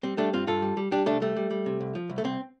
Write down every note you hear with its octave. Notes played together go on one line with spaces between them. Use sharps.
G3 C4
G3 A3 D4
G2 C4 F4
G2 F4 A4
G3
G3
G3 D4 G4
C2 A3 D4
G3 A3
G3
G3
C3
C2
F3
C2
A3
C2 C4